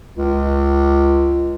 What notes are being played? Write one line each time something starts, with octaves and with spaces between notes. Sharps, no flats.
C#2